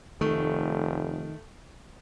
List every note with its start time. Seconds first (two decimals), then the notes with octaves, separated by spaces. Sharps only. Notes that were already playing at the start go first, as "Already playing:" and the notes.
0.21 F1 D#3 A3